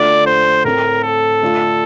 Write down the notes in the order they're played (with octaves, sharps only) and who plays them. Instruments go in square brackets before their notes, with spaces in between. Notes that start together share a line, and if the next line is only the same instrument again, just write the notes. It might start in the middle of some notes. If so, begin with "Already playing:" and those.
Already playing: [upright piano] D3 A3 D4 F4 [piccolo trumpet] D5
[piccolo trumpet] C5
[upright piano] A2 A3 C4 [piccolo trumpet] A#4
[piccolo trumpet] A4
[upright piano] D3 A3 D4 F4